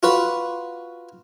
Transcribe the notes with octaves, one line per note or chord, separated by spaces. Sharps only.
F4 F#4 B4